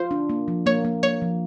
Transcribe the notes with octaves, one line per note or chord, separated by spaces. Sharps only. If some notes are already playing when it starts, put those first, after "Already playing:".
Already playing: F4 C5
D4
A#3
F3
A#3 C#5
A#3
A#3 C#5
F3